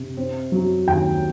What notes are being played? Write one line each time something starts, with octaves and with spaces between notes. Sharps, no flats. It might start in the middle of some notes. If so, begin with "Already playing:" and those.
Already playing: C3
C4
F#3
D#2 G5